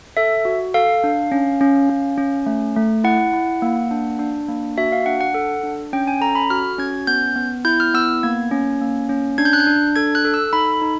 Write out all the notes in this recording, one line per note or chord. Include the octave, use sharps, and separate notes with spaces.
A4 E5
F#4
A4 F5
D4
C#4
C#4
C#4
C#4
A3
A3
E4 F#5
E4
A#3
D4
D4
A#3
F#4 E5
F5
D4 F#5
F#5
A4
D4
C#4 G5
G#5
A4 A#5
B5
F#4 F6
C#4 G#6
B3 G6
B3
E4 G6
F6
B3 E6
A#3 G#6
C#4
A#3
C#4
D4 G#6
G6
F#6
G6
D4
A4 G#6
F#6
A4
E6
D#4 B5
D#4